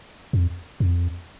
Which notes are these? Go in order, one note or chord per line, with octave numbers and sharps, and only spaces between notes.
F2
F2